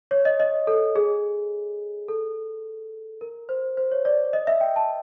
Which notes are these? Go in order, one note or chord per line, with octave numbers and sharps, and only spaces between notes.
C#5
D#5
D#5
A4
G#4
A4
A#4
C5
C5
C#5
D5
D#5
E5
G5
A5